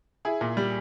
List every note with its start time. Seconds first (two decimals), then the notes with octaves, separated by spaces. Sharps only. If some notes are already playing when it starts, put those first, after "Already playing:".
0.25 E4 G#4
0.41 A#2
0.57 G3